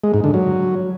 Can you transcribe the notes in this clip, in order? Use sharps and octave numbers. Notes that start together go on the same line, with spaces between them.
G#3
G#2
D3
F#3